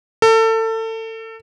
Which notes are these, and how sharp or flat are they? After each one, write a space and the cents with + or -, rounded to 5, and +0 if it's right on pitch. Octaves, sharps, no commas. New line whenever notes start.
A4 +30